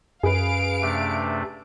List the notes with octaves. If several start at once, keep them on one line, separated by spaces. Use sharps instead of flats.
F#2 G#4 B4 F5 D7
C3 A3 D4